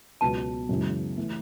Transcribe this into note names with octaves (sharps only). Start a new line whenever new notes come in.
C#2 B2 F#3 B3 A5
F#2 C#3 E3 G#3
E3 A3